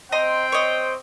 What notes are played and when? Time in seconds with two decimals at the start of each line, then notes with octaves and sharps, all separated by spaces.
0.12 C4 C5 D#5 G5 A#5 C6
0.52 C#5 D#5